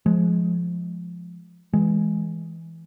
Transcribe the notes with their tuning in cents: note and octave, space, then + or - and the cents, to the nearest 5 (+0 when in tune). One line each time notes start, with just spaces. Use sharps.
F3 +0 G#3 +15
E3 +0 G#3 +0